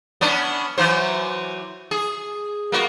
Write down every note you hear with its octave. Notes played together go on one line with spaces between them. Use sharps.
B3 C#4 D4
E3 F#3 C5
G#4
A#3 B3 F#4